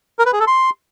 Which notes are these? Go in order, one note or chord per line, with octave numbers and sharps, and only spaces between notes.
A#4
B4
G#4
A4
C6